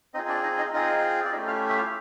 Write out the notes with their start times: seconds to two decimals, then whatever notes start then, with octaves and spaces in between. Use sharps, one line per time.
0.14 C4 D#4 D#5
0.17 F4 G#4
0.29 D4 D5
0.43 D#4 D#5
0.58 D#4 D#5
0.73 C4 D#4 F4 G#4 D#5
1.25 D5
1.32 A3 C#4 D#4 E4 G4 D#5
1.47 F4 F5
1.69 E5
1.77 F4 F5